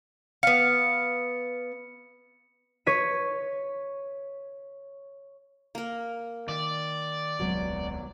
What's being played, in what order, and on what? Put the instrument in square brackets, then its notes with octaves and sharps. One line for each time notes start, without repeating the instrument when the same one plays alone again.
[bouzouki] B3 F5 [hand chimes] C#7
[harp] C#5 B6 D#7
[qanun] A#3 A#4
[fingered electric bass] D#3 [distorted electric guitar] D5
[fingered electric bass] D#1 C2 G#3 [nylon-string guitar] F#3 B3